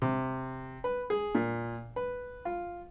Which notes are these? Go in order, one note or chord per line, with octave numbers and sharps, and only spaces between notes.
C3
B4
G#4
A#2
B4
F4